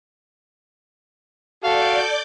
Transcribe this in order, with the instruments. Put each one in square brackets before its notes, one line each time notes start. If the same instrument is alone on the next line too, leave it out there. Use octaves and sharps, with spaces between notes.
[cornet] F#4 [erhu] A4 [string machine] D5 D6 G6 [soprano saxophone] F5